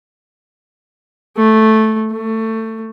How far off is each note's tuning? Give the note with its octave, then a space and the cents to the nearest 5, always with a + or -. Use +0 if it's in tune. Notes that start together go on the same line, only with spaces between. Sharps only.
A3 -5
A3 +20